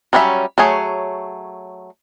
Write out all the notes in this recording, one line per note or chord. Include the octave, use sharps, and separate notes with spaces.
F#3 G3 C#4 F4 E5
F#3 A3 G#4 C#5